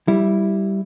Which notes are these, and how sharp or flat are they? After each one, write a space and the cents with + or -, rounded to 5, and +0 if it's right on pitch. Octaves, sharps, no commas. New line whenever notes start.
G3 -5 E4 +0